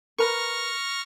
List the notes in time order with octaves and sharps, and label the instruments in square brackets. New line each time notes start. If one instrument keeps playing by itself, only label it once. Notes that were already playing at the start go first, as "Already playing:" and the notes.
[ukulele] A#4 B4 A#5 [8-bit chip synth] C#6 F6 A#6